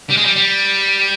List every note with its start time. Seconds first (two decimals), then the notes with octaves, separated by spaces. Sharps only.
0.10 G3
0.17 G#3
0.25 G3
0.36 G3